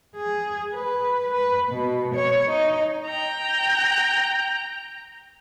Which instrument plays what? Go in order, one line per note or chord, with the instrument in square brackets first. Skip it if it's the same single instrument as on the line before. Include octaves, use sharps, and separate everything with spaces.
[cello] G#4
B4
B4
B2
C#5
D#4
[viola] G5 A#5